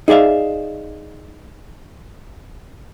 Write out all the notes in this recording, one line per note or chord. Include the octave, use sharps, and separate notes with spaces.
D#4 G#4 D5 E5 F5